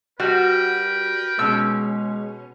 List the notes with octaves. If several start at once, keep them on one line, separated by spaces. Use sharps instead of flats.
G3 F#4 A#4 B4 G5
B2 G#3 C#4 E6